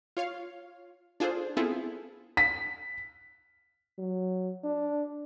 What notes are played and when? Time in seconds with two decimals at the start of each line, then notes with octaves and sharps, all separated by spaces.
0.17 F4 C#5 F5
1.20 D4 F4 G#4 A4 C5
1.57 B3 C4 E4 F4 G#4 A4
2.37 B6
3.99 F#3
4.64 D4